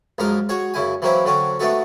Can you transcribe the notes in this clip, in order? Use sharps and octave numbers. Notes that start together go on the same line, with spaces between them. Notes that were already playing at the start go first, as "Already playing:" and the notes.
A#1 F#2 G#3 D#4 A#4 F5
F#4 G#4 C#5
F#2 C#3 E4 G#5
E3 F#3 A#3 C4 C#4 E4
D3 F#3 C4 C#4
A3 B3 D4 D#4 F#4 A4